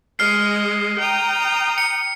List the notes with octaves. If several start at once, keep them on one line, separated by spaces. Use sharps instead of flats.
G#3 D#5 F6 C7
G5 A#5 D#6
C#7